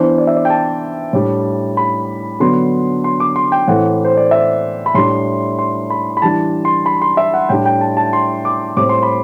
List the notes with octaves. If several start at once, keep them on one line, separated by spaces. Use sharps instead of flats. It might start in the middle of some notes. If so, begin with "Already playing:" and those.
Already playing: E3 B3 D4 C5
D5
E5
D5
G5
A5
A2 G3 D4
B5
D3 F#3 B3 D4 C6
C6
D6
C6
G5
A2 E3 A3 C4 F#5
C5
D5
E5
B5
A2 G3 D4 C6
C6
B5
B5
E3 G3 D4 A5
C6
B5
C6
E5
F#5
A2 G3 D4 G5
G5
A5
A5
C6
D6
A2 G3 C4 D6
C6
B5